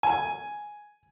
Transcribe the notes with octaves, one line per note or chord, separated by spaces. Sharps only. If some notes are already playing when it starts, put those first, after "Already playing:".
G#5